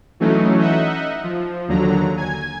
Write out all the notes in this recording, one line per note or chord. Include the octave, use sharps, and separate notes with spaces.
E3 F#3 A3 C#4 D#4
D#4 D#5 E5 F#5
F3
D#2 D3 F#3 A#5
G#5 G#6